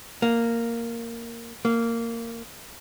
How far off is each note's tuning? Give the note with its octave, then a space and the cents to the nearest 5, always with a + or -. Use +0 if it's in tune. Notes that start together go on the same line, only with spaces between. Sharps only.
A#3 -5
A#3 -15